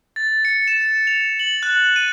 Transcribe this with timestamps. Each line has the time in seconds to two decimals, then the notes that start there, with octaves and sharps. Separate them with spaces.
0.16 A6
0.45 C#7
0.68 E7
1.07 F7
1.39 F#7
1.63 F#6
1.96 D#7